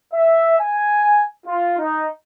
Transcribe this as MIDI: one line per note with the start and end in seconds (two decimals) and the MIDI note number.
0.12 0.55 76
0.59 1.25 80
1.47 1.76 65
1.78 2.08 63